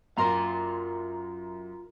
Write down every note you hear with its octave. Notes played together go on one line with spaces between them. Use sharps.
F#2 F4 A#4 A#5 C6